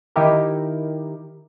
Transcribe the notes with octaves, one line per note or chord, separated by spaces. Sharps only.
D#3 D#4 E4 G4 A#4